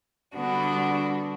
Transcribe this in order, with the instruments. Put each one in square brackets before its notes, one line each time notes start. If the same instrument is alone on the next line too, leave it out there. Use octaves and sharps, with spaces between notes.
[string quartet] D3 G3 B3 D4 F#4